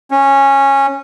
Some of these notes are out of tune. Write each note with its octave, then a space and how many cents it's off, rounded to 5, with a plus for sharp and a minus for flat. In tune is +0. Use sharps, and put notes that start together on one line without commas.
C#4 -15